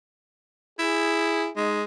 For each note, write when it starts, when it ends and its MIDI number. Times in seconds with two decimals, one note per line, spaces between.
0.79 1.48 64
0.79 1.51 68
1.56 1.84 56
1.56 1.80 63